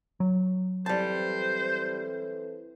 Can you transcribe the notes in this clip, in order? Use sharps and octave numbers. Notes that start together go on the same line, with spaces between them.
F#3
E3 G3 C4 A4 C5 A5